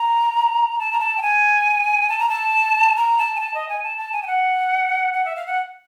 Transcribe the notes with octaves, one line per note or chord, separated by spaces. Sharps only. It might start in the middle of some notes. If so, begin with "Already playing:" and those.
Already playing: A#5
A5
A#5
A5
G5
G#5
A5
A#5
A5
A#5
A5
G#5
A5
D#5
G#5
A5
A5
G#5
G5
F#5
F#5
E5
F5
F#5